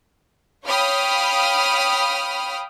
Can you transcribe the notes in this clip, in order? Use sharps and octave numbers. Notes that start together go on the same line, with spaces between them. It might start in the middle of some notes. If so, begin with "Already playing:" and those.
C#5 F5 G5 B5 D#6 F6